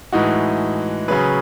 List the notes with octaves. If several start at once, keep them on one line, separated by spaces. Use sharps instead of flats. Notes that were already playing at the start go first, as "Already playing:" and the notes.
A2 E3 G#3 D#4 F#4
C#3 F#3 C#4 G#4 B4